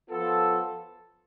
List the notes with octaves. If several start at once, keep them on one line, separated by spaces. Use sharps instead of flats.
F3 B3 F4 A4